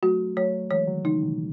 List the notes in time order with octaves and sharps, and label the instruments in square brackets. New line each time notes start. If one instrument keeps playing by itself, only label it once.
[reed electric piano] F#3 A3 [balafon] F#4
[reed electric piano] F#3 A3 [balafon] C#5
[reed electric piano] E3 G#3 [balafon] C#5
[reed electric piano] D#3 F#3
[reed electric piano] C#3 E3 [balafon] D#4
[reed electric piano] B2 D#3